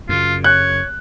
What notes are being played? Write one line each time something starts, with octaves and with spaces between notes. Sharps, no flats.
F#2 C#3 F4
C#5 F#6